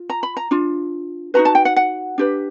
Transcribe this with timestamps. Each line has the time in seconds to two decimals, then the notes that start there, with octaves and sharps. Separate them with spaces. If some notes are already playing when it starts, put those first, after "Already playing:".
Already playing: F4
0.10 A#5
0.23 B5
0.37 A#5
0.51 D4 F4
1.34 D#4 F#4 B4 A#5
1.45 A5
1.55 G5
1.65 F#5
1.76 F#5
2.18 D4 G4 B4